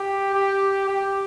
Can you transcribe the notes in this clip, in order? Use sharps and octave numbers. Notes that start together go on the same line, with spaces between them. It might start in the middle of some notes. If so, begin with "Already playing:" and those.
Already playing: G4
G4
G4